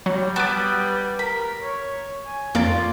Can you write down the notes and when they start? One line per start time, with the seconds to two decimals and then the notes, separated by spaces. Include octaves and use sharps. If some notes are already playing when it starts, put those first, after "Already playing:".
0.06 F#3 G3
0.36 B3 A5 D6
1.19 A#4 B5
1.62 C#5
2.26 G#5
2.55 F2 A#3 F4 D5 A6